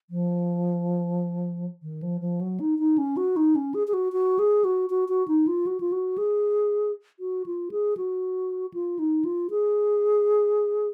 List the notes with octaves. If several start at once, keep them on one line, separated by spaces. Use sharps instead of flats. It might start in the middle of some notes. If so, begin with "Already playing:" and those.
F3
D#3
F3
F3
F#3
D#4
D#4
C#4
F#4
D#4
C#4
G#4
G#4
F#4
F#4
G#4
F#4
F#4
F#4
D#4
F4
F#4
F4
F#4
G#4
F#4
F4
G#4
F#4
F4
D#4
F4
G#4